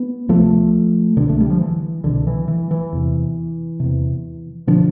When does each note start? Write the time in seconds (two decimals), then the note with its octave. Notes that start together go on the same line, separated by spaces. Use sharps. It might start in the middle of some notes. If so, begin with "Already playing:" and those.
Already playing: B3
0.28 D2 C3 F3 A3
1.17 C2 B2 D3
1.29 A3
1.40 G3
1.50 F3
1.61 E3
2.04 C2 B2 D3
2.27 E3
2.48 E3
2.71 E3
2.93 E2 C3
3.80 E2 C3
4.67 B2 D3 F3